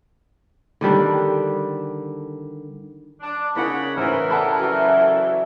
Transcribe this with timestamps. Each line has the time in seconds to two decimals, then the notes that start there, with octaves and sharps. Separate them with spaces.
0.81 D3 D#3 G3 D4
3.21 D4
3.55 C#3 A#3 D#4 C#5 F#5 B5
3.96 A1 C#3 E3 A#4 C5
4.30 A4 D5 F#5 A5 B5
4.59 F#3 E5
5.01 A4